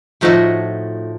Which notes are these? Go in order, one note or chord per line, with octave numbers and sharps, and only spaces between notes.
A2 F3 A3 D#4 F#4